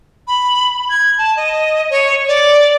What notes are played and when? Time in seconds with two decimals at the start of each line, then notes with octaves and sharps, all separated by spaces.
0.28 B5
0.90 G#6
1.18 A5
1.37 D#5
1.90 C#5
2.28 D5